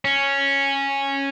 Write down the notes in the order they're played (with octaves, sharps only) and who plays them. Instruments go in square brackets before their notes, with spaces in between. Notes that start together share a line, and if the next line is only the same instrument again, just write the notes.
[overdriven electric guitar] C#4